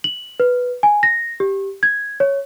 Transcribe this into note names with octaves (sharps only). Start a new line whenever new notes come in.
F#7
B4
G#5
A#6
G4
G#6
C#5